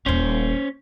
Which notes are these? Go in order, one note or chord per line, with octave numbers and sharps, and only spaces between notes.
D#1 E3 C#4 C5